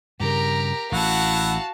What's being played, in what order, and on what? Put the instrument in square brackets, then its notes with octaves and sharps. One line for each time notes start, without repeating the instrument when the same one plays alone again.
[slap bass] G2 C#3 [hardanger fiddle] G4 A#4 [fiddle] A#5
[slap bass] A1 [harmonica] E4 F#5 [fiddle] F#4 A5 [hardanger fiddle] F5